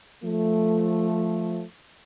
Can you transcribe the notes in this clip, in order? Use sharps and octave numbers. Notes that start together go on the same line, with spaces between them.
F3 A3